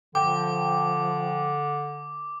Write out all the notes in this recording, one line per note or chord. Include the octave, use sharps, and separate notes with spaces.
D3 F3 G5 D6